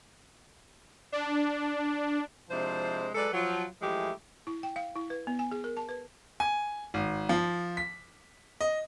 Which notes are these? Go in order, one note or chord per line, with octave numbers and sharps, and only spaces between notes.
D4
C3 F3 G#3 D4 E4 C5
F#3 G#3 A4 B4 D5
F3 F#3 F4
E3 F3 G#3 A3 E4 G4
E4
G5
F5
E4
B4
B3
G#5
G#4
A#4
A5
B4
G#5
G#1
F3
B6
D#5